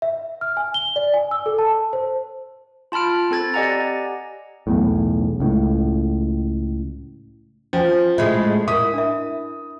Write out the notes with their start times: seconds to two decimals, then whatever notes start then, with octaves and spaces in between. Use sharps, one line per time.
0.02 E5
0.41 F6
0.57 G#5
0.74 G7
0.96 D5
1.14 G#5
1.31 E6
1.46 A4
1.58 A5
1.93 C5
2.92 F4 A5 B5 F6 D7
3.31 C4 A4 G#6 A6
3.54 G4 D5 D#5 F#5 G#5 A#5
4.67 B1 E2 A2
5.40 C#2 A2
7.73 F3 C#4 G#5
8.18 A2 G#3 E5
8.68 E4 A#4 B4 D#6
8.94 D4 A#4 E5